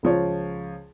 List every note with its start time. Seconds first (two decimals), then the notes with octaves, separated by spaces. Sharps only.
0.03 C#2 F3 C#5